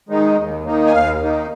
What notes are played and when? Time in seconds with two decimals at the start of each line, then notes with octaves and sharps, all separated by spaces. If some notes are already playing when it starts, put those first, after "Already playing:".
0.09 D#3 G#3 D#4
0.37 D#2
0.64 D#3 A#3 D#4
0.86 G#5
0.92 D#2 F5
1.19 D#3 A#3 D#4